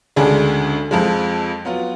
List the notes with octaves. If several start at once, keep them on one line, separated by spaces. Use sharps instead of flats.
D2 C#3 G#3 D4 G#4
F2 F3 G#3
F#3 B3 F4